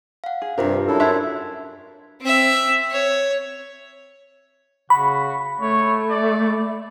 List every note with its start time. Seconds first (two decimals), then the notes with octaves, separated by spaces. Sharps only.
0.24 F5 F#5
0.42 G#4
0.58 G2 C3 D4 F4 G4 A#4
0.87 F#2 E4 A4
1.00 F#2 D4 C#5 E5 C6 E6 G#6
2.21 C4 E5
2.91 C#5
4.90 C#3 F#4 B5
5.60 A3 C#5
6.10 D5